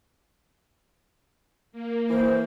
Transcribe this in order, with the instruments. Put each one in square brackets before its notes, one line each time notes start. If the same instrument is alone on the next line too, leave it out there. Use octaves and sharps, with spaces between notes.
[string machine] A#3
[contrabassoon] E3 [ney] C5